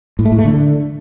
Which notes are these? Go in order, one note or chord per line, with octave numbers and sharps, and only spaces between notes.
A2
A3
A2
A3
D3